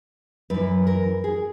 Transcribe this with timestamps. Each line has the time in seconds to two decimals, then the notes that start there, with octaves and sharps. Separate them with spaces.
0.50 F#2 E3 B4
0.87 A#4
1.24 G#4